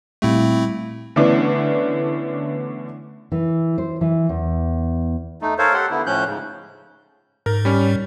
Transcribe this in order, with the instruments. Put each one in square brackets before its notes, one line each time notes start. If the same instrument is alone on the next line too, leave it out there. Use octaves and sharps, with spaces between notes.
[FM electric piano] A#2 G3 [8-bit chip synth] A3 C4 E4
[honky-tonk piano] D3 E3 A3 B3 C#4 D4
[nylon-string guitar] E3
C5
E3
E2
[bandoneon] A3 D#4
A4 A#4 C5 C#5 F5
G4 A4 F#5 C6
D3 B3 E4
A2 F3 C#4 F#6 G6
G#2 C#3
[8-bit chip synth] G#2 [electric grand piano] A#4
[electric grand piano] G3 C#4